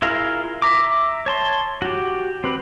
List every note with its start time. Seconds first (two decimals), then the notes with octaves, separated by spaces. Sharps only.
0.02 E4 F4 G#4 A#4 F5
0.62 E5 A#5 D6
1.26 C#5 A5 C6
1.82 F#4 G4
2.44 C4 G4 B4